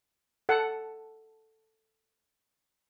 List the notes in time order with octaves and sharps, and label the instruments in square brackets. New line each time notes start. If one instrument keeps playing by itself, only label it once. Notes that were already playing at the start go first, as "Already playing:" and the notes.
[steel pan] A4 F#5